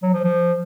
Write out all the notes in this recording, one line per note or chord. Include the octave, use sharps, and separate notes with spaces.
F#3
F3
F3